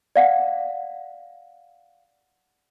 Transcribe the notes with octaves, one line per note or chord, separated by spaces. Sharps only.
D5 F5 F#5